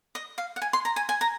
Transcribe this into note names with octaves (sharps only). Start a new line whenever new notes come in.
D#5
F5
F#5
G#5
C6
A#5
G#5
G#5
A#5